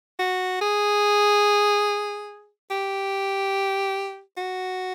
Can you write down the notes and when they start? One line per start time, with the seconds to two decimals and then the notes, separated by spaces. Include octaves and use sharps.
0.19 F#4
0.61 G#4
2.70 G4
4.37 F#4